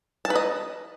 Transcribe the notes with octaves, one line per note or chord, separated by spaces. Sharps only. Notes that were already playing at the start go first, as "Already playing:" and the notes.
A5
B4
D#5